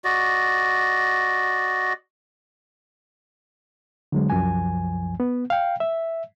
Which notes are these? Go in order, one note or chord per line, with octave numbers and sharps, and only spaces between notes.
F#4 D5 D#5
D3 F#3 G#3
C2 F#2 F3 G#5
B3
F5 G5
E5